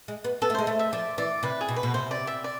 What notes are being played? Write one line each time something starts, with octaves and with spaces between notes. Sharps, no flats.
G#3
B3
B3 A4
A3
G#3 C5
A3
E5
F3 D5
E3 D5
C3 B4
G#4
B2
B4
B2
C3 C5
D5
E5
D5